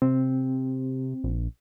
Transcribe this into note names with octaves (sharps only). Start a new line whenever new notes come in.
C3 C4
A#1